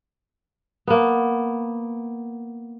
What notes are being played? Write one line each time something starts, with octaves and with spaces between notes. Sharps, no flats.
A#3 B3